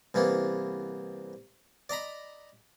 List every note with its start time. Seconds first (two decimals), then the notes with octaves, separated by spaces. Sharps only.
0.14 C2 E3 A#3 B3
1.89 D5 D#5 A#5 B5